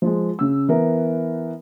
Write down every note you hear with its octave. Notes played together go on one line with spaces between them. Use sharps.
F3 G#3
C#3 E6
E3 B3 A#4